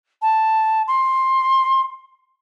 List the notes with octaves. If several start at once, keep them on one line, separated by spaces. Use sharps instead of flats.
A5
C6